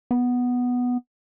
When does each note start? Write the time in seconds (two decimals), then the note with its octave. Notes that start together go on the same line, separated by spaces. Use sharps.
0.11 B3